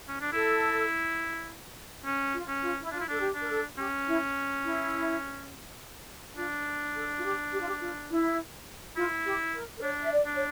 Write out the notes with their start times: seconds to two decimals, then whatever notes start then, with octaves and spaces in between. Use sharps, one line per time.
0.08 C#4
0.21 D4
0.32 E4 A4
2.05 C#4
2.34 F4
2.48 C#4
2.62 F4
2.81 E4
2.92 D4 F4
3.00 E4
3.08 D4 A4
3.20 G4
3.35 D4
3.41 A#4
3.50 A4
3.78 C#4 G4
4.07 E4
4.65 E4
6.37 D4 F4
6.95 A4
7.18 F4
7.24 G4
7.52 G4
7.60 F4
7.68 G4
7.81 F4
8.10 E4
8.96 E4 F4
9.25 G4
9.53 A#4
9.78 A#4
9.82 D4 C#5
10.00 E5
10.12 D5
10.26 D4
10.36 C#5